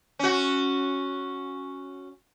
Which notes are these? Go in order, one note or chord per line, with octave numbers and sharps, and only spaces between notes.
C#4 F#4